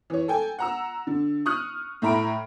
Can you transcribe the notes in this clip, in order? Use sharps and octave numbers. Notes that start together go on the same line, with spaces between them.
E3 C#5
A4 G5 G#5
F#5 A#5 E6
D3
C#6 D#6 F6 F#6
A2 E5 A#5 B5 D7